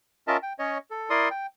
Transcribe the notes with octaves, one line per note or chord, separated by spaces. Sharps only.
C#4 F4 A#4 D#5 E5 A5
G5
C#4 C#5 D#5
A4
E4 A#4 D5 C6 D#6
G5